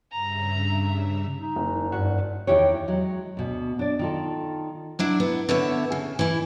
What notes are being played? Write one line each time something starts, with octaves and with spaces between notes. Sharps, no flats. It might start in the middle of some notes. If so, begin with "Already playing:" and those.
G2 C#3 E5 A#5
D#4
F#1
G2 F#4
E2 D#3 E4 G4 C#5
F#3 G#3
D2 B2
D4 D5
D#3 F4 A4
F#3 D4 E4
B3
D3 B3 C#5 E5
C#3
E3 E4